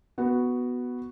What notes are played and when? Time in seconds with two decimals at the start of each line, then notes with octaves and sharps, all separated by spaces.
0.18 B3 F#4